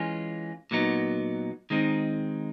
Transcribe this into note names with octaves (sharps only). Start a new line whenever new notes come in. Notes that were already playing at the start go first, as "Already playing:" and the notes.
Already playing: E3 G#3 C#4 F4
A#2 F#3 B3 D#4
D#3 G#3 C4 D#4